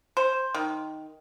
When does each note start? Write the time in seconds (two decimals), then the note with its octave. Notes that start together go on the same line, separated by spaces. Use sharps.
0.17 C5
0.54 D#3